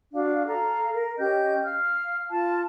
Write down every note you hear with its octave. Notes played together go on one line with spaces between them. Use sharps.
D4 F#4 F5
A4 F5 A#5
A#4
C#4 G4 D#5 G6
F5 F6
F4 A5